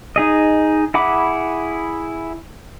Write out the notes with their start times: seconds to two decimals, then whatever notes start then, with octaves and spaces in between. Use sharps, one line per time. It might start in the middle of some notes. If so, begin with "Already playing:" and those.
0.16 D#4 G#4 D#5
0.94 E4 G#4 F#5 B5 D6